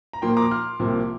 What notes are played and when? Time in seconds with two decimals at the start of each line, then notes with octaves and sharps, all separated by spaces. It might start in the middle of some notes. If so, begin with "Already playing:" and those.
0.13 A#5
0.22 A#2 F3 A#3 G5 C6
0.37 A#5 D6
0.51 C6 F6
0.79 C2 C3 F3 A#3